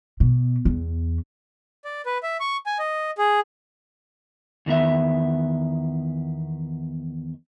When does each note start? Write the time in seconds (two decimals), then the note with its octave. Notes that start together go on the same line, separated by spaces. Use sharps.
0.20 B2
0.65 E2
1.85 D5
2.06 B4
2.23 E5
2.40 C#6
2.66 G#5
2.79 D#5
3.18 G#4
4.66 E2 D#3 B3 E5